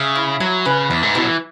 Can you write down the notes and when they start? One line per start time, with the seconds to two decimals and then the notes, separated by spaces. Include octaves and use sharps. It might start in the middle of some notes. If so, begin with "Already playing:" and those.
Already playing: C#3 E5
0.16 E4
0.40 F#3 G#5
0.65 C#3 B4
0.90 E2 E5
1.03 G#2
1.15 B2 E4
1.22 F#3
1.27 E3